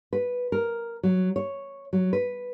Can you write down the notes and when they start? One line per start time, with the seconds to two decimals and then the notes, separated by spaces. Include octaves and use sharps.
0.13 B4
0.52 A#4
1.03 F#3
1.36 C#5
1.93 F#3
2.13 B4